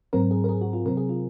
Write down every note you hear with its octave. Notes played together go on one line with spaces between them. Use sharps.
G#2 F#3 C4 A#4
G#4
A#4
G#4
F#4
F4
C3 F#3 C4 A#4
G#4
F4